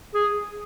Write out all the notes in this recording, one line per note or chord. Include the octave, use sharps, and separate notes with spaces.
G#4